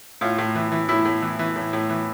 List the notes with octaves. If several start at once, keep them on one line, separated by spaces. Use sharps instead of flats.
A2 F4
A2
E3
E3
A2 E4
A2
E3
E3
A2
A2
E3